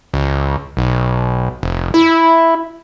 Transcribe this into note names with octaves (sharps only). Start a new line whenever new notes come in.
C#2
B1
F1
E4